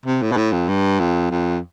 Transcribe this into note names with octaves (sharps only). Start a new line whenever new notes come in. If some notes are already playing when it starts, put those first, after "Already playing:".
C3
A2
B2
A2
F2
G2
F2
F2